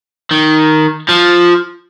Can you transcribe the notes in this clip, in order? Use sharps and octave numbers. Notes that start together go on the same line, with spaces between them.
D#3
F3